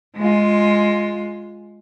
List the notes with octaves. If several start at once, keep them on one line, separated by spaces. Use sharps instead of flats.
G#3 F4